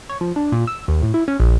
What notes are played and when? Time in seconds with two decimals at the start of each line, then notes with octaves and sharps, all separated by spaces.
0.09 C#5
0.21 F3
0.36 D4
0.52 A#2
0.67 E6
0.88 D#2
1.02 A2
1.14 E4
1.28 C#4
1.40 A#1